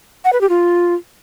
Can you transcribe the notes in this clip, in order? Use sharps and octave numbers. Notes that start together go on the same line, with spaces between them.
F#5
B4
G4
F4